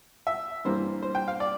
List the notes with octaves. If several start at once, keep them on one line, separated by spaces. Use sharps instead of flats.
E5
G2 E3 G3 A#3 C5
C5
G5
F5
D5